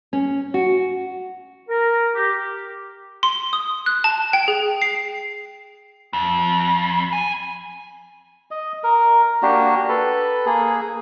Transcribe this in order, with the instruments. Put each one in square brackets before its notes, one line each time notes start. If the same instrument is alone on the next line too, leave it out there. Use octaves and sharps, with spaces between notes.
[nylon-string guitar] C#4
F#4
[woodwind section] A#4
G4
[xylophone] C6
D#6
F#6
A5
G5
G#4
C7
[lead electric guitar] F2
G#5
[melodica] D#5
A#4
A#3 D4 F#4 G4
A4 B4
A#3 G#4